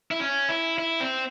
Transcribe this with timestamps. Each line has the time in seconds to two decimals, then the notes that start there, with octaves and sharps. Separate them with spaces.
0.11 E4
0.20 C#4
0.49 E4
0.78 E4
1.00 C4